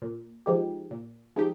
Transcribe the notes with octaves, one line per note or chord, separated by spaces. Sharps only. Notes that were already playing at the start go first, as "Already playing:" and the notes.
A#2
F3 G#3 D#4 G4
A#2
F3 G#3 D#4 G4